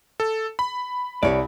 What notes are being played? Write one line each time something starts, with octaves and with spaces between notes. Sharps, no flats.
A4
B5
C2 G4 C#5 D5